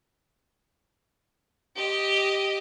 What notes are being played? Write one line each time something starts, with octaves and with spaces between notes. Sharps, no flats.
G4 D#5